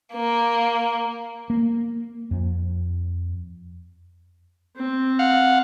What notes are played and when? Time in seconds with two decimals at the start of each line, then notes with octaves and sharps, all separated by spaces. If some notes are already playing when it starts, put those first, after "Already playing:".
0.13 A#3
1.50 A#3
2.31 F2
4.76 C4
5.19 F5 F#5